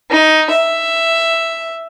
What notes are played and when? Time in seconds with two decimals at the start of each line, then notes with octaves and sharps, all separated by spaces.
0.10 D#4
0.50 E5